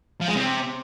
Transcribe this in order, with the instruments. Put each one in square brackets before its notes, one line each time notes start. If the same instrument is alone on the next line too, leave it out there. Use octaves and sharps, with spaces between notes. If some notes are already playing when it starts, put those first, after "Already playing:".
[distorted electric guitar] F3
G#3
C3